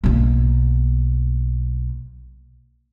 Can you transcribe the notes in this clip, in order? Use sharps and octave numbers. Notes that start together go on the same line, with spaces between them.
B1 A#3